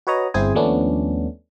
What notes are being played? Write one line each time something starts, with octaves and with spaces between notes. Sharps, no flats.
F#4 B4 C#5 D#5 A#5
G1 C4 E4 G#4 C5 G#5
D#2 F3 A3 B3 C#4 D4